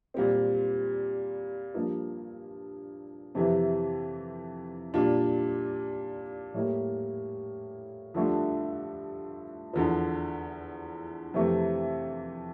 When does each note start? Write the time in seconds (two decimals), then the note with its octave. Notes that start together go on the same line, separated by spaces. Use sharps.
0.14 A#2 G3 C4
1.74 G2 F3 A#3
3.35 F2 C3 E3
4.94 A#2 G3 D4 F4
6.54 A2 G3 A#3
8.14 G2 D3 F3 A3 D4
9.73 E2 D3 F3
11.34 F2 C3 E3 A3 C4